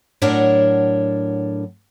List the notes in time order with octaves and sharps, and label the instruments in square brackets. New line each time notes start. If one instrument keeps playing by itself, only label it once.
[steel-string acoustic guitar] A2 F#3 D4 A#4 C#5 F#5